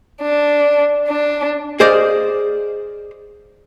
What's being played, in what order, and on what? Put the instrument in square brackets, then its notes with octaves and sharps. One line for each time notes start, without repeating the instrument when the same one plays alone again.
[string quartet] D4
D4
[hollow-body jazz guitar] G#4 C5 D5 D#5 F5